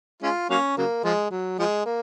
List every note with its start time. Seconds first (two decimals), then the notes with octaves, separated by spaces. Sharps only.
0.22 G#3 C#4 F4
0.50 F#3 A#3 C#4
0.78 C#3 F#3 A#3
1.04 F3 G#3
1.31 F#3
1.59 F3 G#3
1.86 A#3